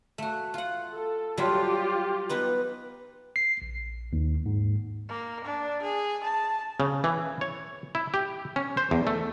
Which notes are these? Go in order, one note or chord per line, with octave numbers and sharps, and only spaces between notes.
A3 F#4
F4 F#5
A4
F#3 G3 A3 F4 G4
B3 D#4 B4
C7
A#1
D#2
G#2
A#3
D4
G#4
A5
C#3
E3
C#5
E4
G4
C#4
C5
E2
A3